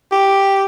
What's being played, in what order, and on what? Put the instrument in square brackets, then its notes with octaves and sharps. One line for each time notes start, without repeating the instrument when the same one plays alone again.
[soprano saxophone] G4